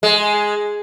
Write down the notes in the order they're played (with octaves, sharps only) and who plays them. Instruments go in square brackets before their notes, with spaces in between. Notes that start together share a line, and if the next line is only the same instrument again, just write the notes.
[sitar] G#3